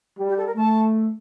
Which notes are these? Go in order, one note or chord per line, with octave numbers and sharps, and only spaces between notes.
G3
G4
A4
A#4
A3 A5